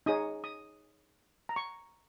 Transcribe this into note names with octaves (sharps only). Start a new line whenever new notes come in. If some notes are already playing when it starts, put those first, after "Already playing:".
D#4 G#4 C#5 D#6
D#6
A#5
C#6